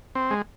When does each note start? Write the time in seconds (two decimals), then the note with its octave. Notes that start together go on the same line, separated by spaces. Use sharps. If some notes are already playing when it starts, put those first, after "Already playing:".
0.15 C4
0.30 G#3